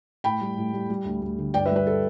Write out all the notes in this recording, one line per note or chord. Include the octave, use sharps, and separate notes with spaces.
A2 G5 B5
G3
A2
G3
G3
D2
D2
D3
G2 D5 G5
B4 E5
G3
B4
A4